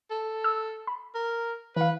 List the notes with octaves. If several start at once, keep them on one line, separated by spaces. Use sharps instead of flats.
A4
E6
B5
A#4
E3 B4 F5